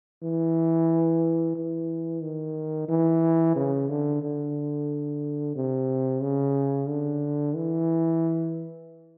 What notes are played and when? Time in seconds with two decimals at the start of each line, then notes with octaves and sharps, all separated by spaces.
0.22 E3
1.56 E3
2.23 D#3
2.88 E3
3.55 C#3
3.89 D3
4.22 D3
5.55 C3
6.22 C#3
6.88 D3
7.55 E3